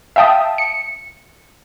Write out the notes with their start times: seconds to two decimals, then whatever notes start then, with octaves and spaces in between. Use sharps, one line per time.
0.16 E5 F5 G5 A5 D#6
0.58 C#7